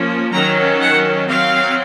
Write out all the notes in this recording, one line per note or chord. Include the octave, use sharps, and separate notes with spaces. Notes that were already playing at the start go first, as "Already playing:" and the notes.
Already playing: F3 A#3 C#4
D#3 F#3 C#4 A#5
F#5
F#3 C4 F5